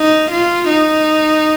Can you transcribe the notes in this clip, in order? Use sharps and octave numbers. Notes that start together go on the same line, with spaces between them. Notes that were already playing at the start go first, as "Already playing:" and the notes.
Already playing: D#4
F4
D#4